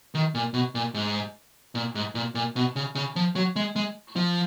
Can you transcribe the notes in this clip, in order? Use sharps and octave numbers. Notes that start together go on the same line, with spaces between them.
D#3
A#2
B2
A#2
G#2
A#2
G#2
A#2
A#2
B2
C#3
C#3
F3
F#3
G#3
G#3
F3